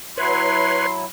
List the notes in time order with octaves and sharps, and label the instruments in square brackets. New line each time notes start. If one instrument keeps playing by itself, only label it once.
[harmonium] F#3 E4 [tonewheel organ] B4 C#5 [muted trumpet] C6